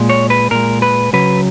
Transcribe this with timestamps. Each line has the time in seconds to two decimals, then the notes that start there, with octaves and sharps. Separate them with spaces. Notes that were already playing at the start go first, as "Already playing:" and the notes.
Already playing: A#2 G#3
0.10 C#5
0.30 B4
0.51 A#2 G#3 A#4
0.82 B4
1.13 C#3 F#3 B4